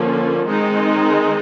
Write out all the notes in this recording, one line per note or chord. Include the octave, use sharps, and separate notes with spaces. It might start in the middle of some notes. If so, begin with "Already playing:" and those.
Already playing: D3 F3 A#3 C#4
D#3 G#3 C4 D#4